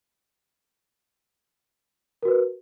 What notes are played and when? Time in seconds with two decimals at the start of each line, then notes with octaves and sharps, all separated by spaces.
2.23 A#4
2.25 F#4
2.28 B4